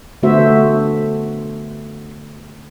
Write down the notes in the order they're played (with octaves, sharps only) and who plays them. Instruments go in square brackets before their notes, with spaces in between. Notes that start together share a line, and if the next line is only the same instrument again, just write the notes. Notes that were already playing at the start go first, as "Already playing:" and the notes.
[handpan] D3 A3 B3 F#4 C5 E5